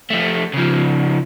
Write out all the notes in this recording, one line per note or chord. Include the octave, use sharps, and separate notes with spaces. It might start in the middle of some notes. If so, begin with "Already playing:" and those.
F3 A3
C#3 F3